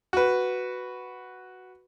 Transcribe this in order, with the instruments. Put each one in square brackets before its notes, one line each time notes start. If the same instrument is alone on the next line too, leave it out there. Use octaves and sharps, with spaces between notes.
[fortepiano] F#4 B4